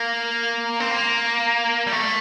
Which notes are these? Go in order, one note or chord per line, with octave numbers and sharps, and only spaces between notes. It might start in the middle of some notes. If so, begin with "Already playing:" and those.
Already playing: A#3
C4
A#3
G3
A3